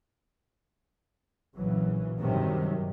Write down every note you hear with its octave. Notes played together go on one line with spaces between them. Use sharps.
A#1 C#3 E3 F#3
G2 C3 D#3 F#3